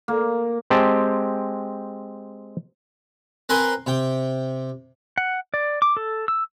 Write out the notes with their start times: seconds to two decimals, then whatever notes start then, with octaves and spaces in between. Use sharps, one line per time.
0.08 A#3
0.70 G#3 C4 G4 G5 A5
3.49 C4 A#4 B4 G#5 C6
3.87 C3 G5
5.18 F#5
5.54 D5
5.82 D6
5.97 A4
6.28 E6